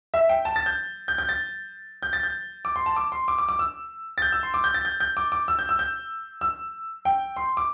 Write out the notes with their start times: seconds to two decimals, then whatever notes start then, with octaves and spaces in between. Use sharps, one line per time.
0.14 E5
0.29 G5
0.45 A5
0.56 A6
0.66 G6
1.08 G6
1.18 G6
1.29 A6
2.03 G6
2.13 A6
2.23 G6
2.65 D6
2.76 C6
2.86 A5
2.96 D6
3.12 C6
3.28 D6
3.38 D6
3.49 D6
3.59 E6
4.18 A6
4.22 G6
4.32 E6
4.43 C6
4.54 D6
4.64 G6
4.74 A6
4.85 G6
5.00 G6
5.17 D6
5.32 D6
5.48 E6
5.59 G6
5.69 E6
5.79 G6
6.41 E6
7.05 G5
7.37 C6
7.57 D6